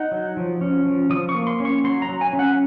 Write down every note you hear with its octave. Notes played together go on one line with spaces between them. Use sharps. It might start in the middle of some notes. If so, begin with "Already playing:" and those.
Already playing: D#4 F#5
F#3
F3
C#4
F3
F3 D#6
C#6
A#3
C6
C#4 C#6
F#3 C6
A#5
F#3
G#5
C#4
F#5